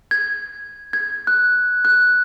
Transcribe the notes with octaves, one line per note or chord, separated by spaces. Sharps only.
G#6
G#6
F#6
F#6